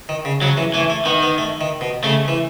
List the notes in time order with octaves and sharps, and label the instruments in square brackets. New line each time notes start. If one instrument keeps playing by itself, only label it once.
[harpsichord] D#3
C#3
[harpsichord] C#3 [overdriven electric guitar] F#3
[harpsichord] E3
[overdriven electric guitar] E3 [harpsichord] A3
[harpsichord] A3
[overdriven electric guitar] D#3 [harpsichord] B3
[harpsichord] B3
A3
D#3
B2
[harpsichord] C#3 [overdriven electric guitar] A3
[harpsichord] E3